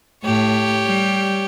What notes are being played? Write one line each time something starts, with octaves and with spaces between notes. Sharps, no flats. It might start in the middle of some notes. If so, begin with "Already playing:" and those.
A2 G4 C#5
G3